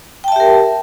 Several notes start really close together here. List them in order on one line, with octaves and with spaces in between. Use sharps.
G5 A5 E5 G4 A#4